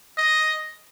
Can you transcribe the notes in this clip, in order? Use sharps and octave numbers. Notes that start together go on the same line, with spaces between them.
D#5